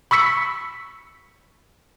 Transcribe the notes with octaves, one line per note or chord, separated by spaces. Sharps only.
B5 C#6 E6 B6 C#7